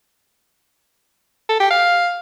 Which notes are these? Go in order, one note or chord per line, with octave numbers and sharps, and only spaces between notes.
A4
G4
F5